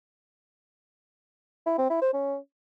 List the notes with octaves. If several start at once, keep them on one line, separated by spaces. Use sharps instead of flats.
E4
C4
E4
C5
C#4